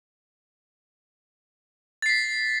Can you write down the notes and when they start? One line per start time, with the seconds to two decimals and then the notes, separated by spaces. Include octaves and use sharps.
2.02 A6
2.06 C7
2.09 B6